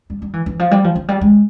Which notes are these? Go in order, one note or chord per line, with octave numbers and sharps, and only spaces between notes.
G3
G3
E3
E3
F3
G3
F3
F3
G3
G#3